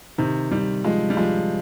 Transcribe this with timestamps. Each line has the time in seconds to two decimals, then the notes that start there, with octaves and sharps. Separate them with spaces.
0.18 C3 D#3
0.51 D#3 G3
0.84 F3 G#3
1.10 G3
1.17 F3 G#3